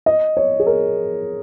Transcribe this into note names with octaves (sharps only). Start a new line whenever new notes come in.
D#5
C#5
G#4
A#4